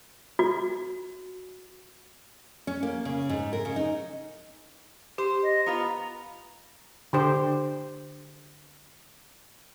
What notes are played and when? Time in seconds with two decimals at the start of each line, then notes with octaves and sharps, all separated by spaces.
0.39 F#4
2.67 C#4
2.83 A#3
3.05 C#3
3.29 G#2
3.53 A#4
3.65 C#3
3.76 D#4
5.18 G4 C5
5.43 D#5
5.66 B3 F4 B4 A#5
7.13 D3 G4 C5